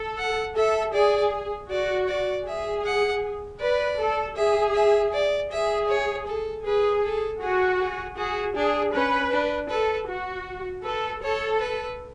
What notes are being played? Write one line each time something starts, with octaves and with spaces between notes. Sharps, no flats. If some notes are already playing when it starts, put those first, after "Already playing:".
Already playing: A4
F#5
A4 E5
G#4 D5
F#4 D5
D5
G#4 E5
F#5
B4 D5
A4
G#4 E5
E5
D5
G#4 E5
C#5
A4
G#4 B4
A4
F#4 G#4
G#4
F#4 G#4
D4 G#4
C#4 B4
D4
A4 B4
F#4
A4 B4
A4 C#5
B4